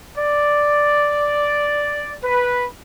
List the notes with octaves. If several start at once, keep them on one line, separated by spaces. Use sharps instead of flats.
D5
B4